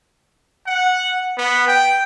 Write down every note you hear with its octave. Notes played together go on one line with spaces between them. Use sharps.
F#5
B3
G5